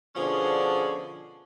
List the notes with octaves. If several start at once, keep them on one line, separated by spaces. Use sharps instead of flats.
B2 D3 F3 C#4 D4 G#4